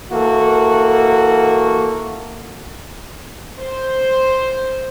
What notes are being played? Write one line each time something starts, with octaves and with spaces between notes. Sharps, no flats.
E3 A#3 F#4 A4
C5